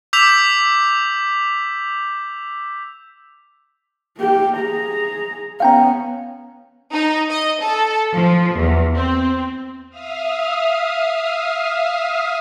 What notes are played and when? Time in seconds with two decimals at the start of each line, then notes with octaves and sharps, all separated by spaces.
0.13 D6 E6 G6 B6 F7
4.18 A#3 G4
4.57 G#4 A#5
5.60 B3 C#4 F5 G5 A#5
6.93 D#4
7.30 D#5
7.62 A4
8.15 F3
8.57 E2
8.95 C4
9.90 E5 F5 D#6 F6